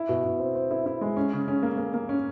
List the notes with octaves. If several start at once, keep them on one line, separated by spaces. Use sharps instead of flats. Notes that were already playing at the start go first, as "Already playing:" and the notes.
Already playing: E4
B2
B2
C4
C4
E4
E4
G#3
C#4
C#3
C#4
A#3
A#3
A#3
C#4